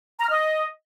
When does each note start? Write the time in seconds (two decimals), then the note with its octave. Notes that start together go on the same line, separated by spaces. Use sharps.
0.20 A#5
0.26 F6
0.31 D#5